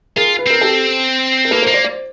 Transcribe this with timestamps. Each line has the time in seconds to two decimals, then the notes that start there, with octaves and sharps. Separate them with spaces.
0.17 F4 G#4 A#4
0.39 B4
0.46 C4 A#4
0.61 G4 A4
1.45 A#4
1.51 A#3 A4 B4
1.62 A#4 C5
1.67 A#3 D#5
1.74 C5 D5
1.84 C5 D5